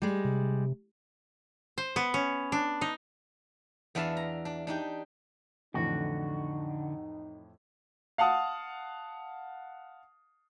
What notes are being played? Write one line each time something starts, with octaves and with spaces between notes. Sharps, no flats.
G3 G#3
C3
C5
B3
C#4
D4
D#4
E2 B3 D4 E5 F5 A5
A#5
D4
D4 D#4 G4
F2 A2 D3 E3 D#4 F#4
F5 F#5 A5 D#6